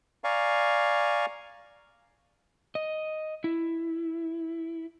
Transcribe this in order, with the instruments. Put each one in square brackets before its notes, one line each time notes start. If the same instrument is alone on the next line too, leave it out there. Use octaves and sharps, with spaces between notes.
[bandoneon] D5 F5 G#5 A#5 C#6
[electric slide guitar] D#5
E4